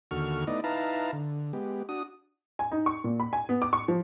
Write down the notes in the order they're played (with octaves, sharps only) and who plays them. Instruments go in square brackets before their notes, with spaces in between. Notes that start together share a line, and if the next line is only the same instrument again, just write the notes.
[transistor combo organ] D#2 D3 F#4 A4 C#6 F6
A3 B3 D#4 E4 D5 D#5
D#4 E4 B4 F5 A5 A#5
D3
G#3 B3 G4
D4 F#4 D#6
[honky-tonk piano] G#5
D#4
C#6
A#2
B5
G#5
B3
D6
C#6
F3